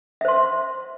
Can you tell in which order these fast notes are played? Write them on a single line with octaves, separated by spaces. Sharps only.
E5 C5 C6